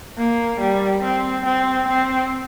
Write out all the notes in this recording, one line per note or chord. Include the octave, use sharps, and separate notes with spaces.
A#3
G3
C4
C4
C4